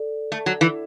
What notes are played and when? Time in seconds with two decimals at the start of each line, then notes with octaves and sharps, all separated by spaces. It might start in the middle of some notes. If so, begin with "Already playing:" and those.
Already playing: A4 D5
0.32 A3
0.46 F#3
0.61 E3